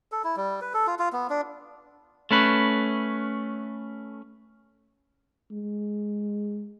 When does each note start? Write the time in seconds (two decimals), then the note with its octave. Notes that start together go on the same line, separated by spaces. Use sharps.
0.12 A4
0.24 E4
0.36 G3
0.61 B4
0.74 A4
0.87 F4
0.99 F4
1.13 B3
1.30 D4
2.31 A3 C#4 B4
5.51 G#3